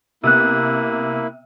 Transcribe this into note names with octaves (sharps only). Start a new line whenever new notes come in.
C3 A#3 B3 E4 E6 F#6